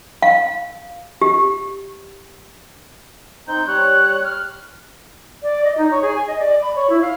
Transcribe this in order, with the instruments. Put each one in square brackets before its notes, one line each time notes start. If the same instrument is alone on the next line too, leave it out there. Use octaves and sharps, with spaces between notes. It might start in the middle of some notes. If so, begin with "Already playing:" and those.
[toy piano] F5
G4
[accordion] C4 D#4 [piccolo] G6
[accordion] G3 C#5 [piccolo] F#6
[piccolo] F6
[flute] D5
D#5
D#4
C#5
G#4
G#5
D#5
D5
B5
C#5
E4
F5